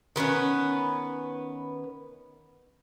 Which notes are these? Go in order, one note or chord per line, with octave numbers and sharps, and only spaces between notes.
D#3 B3 C#4 B4